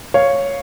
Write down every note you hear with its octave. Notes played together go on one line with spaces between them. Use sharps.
C#5 F5